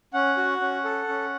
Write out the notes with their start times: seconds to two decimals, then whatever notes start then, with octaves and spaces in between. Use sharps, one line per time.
0.13 C#4 F#5
0.37 F#4
0.61 C#4
0.84 A4
1.09 C#4